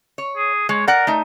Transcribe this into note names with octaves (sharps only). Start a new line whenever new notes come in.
C#5
G#4
G#3 C#5
A#4 D5 F#5
A3 D#4